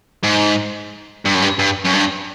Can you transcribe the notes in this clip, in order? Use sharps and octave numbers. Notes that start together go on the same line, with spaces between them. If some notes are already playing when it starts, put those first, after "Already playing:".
G#2
G2
F#2
G2
G2
F#2
G2